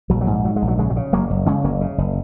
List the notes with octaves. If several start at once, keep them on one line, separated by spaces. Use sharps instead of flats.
A#1 F#3
F#3
G#2
G#2 F#3
G#3
A#1
F#3
C#3 G#3
F#3
C#3
F#1 F#3 A#3
F#1
C#3 G#3 C#4
F#1 F#3 A#3
C#3
F#1